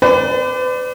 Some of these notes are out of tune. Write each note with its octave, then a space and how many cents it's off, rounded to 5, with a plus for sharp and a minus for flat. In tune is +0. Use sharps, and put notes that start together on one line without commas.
B4 +45 D5 +0